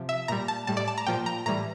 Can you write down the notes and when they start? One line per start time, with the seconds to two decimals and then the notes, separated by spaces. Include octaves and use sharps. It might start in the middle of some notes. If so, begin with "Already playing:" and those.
Already playing: C3 F3
0.09 E5
0.28 A#2 G3 A#5
0.48 A5
0.67 A2 G3 A5
0.77 D5
0.88 A5
0.98 A#5
1.06 A#2 F3 G5
1.26 A#5
1.46 A2 E3 G3 A#5